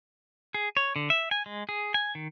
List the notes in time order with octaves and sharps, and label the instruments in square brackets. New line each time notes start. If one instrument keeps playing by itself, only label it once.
[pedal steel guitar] G#4
C#5
D3
E5
G#5
G#3
G#4
G#5
D#3